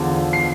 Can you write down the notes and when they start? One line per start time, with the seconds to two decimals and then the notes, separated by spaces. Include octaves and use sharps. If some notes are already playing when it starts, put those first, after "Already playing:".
Already playing: E2 D3 F3
0.33 C7